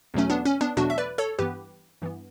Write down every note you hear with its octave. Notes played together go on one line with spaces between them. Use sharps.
E2 B2 F#3 A3 C#4
B3 D4
C#4
B3 D4
E2 B2 F#3 A3 D4 F#4
E5
B4 D5
A4 C#5
G2 E3 B3 G4 B4
G2 E3 B3